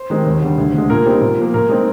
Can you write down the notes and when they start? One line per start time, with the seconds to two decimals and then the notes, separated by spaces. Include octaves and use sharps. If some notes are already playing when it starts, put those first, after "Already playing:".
Already playing: C5
0.10 D#3 G#3 C4 D#4
0.26 D#2
0.42 D3 G3
0.58 D2
0.74 D3 G#3
0.90 A#2 A#4
1.06 G3 C4 D#4
1.22 A#2
1.37 F3 A#3
1.54 A#2 A#4
1.69 G#3 C4 D#4